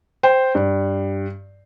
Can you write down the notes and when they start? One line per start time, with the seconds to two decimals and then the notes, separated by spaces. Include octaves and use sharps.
0.23 C5 G5
0.55 G2